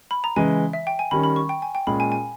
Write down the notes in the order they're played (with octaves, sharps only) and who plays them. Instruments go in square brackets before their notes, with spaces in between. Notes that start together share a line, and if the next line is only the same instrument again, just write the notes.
[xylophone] B5
A#5
[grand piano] C#3 E3 G#3 [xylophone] G#5
[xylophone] E5
G5
G#5
[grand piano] D#3 G3 C#4 [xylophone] B5
[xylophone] B5
C#6
G5
G#5
G5
[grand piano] A#2 G#3 C#4 G#4 [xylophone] B5
[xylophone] G#5
G#5